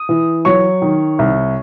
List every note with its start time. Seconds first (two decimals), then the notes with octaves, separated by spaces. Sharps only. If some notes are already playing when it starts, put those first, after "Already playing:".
Already playing: D#6
0.09 E3
0.45 F#3 C#5 C#6
0.82 D#3
1.19 C2